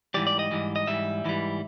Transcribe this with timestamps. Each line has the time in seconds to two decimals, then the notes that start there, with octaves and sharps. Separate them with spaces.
0.14 G#2 E3 G3 D5
0.27 D5
0.39 D#5
0.51 G#2 E3 G3
0.76 D#5
0.87 G#2 E3 G3 E5
1.25 G#2 E3 G3